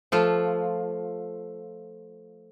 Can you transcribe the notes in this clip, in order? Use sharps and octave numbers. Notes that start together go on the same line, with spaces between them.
F3 A3 F4